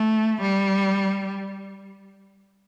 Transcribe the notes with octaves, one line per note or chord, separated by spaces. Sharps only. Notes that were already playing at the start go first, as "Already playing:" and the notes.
Already playing: A3
G3